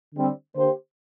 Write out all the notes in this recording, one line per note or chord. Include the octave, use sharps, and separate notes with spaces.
D3 G3 C4
D3 A#3 G4 C5